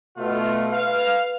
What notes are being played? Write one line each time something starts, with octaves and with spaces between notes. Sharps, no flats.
B2 A3 F4
B4 F5